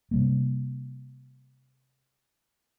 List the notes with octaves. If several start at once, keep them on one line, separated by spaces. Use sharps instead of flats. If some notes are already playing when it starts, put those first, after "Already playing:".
C3 G3 A#3